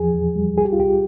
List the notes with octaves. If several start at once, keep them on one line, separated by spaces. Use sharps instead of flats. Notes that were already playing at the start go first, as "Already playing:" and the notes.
Already playing: E2 F3 G#4
E2
G3
C2 G#4
G4
F4
C2 G4